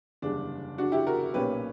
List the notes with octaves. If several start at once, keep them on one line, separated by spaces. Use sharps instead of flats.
F#1 E2 D3 G3 D4
D4 F#4
E4 G4
F#4 A#4
B1 A#2 A#3 C#4 G4 B4